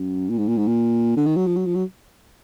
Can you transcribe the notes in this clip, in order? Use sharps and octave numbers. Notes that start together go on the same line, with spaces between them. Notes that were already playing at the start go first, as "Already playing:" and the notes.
Already playing: F#2
A#2
G#2
A#2
G#2
A#2
D3
D#3
F#3
F3
F#3
F3
F#3